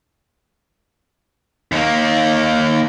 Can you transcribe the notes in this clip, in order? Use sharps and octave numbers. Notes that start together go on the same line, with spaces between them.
D#2 A#3